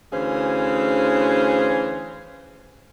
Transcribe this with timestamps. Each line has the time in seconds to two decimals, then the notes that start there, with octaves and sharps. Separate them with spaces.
0.12 D2 E3 C#4 G#4 C5 F5